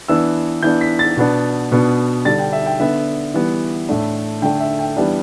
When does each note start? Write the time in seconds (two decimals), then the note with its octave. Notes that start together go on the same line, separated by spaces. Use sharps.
0.08 E3 B3 D4 E6
0.63 E3 B3 D4 G6
0.81 B6
0.99 A6
1.17 B2 B3 D4
1.72 B2 B3 D4
2.25 D3 G3 D4 A6
2.39 G5
2.53 E5
2.66 G5
2.80 D3 B3 D4 E5
3.34 E3 G3 B3
3.89 A2 A3 D4
4.42 D3 A3 D4 G5
4.60 E5
4.79 G5
4.97 E3 G3 B3 D4